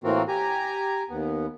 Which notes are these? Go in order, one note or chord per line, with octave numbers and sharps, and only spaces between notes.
A2 E3 A#3 C4 F4 F#4
G4 G#5 A#5
D#2 B3